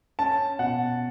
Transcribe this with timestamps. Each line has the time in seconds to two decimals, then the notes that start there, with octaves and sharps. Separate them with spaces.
0.19 C#4 A5
0.59 B2 F#5